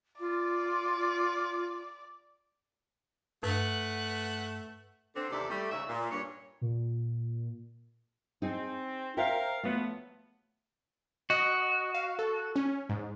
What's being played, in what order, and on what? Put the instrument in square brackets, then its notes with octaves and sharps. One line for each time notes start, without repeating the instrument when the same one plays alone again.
[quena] F4 [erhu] D5
[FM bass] G2 [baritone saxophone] A3 [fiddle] B4 F#5
[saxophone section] D3 C4 D4
D#2 C3 E3 E4 A4 D5
G3 A3
D#2 G#2 C#3 C#4 E5
A#2
G2 C#5
[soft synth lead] A#2
[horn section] C4 [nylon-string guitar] D#4 G#4
[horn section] A#4 F5 [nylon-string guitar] C5 E5 G5
[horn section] F3 F#3 B3 [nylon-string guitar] A3
[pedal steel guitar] F#4 [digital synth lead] D#5
[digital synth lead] F5
A4
C#4
G#2